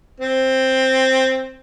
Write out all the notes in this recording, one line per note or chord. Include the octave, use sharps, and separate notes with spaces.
C4